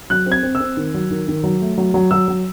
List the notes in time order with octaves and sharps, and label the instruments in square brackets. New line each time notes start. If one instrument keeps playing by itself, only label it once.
[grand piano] F#3 F#6
C4
G#6
C4
E6
C4
D#3
F#3
D#3
D#3
F#3
A3
F#3
F#3
F#3 E6
F#3